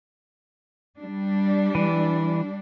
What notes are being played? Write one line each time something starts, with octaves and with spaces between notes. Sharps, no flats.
G3 D4
E3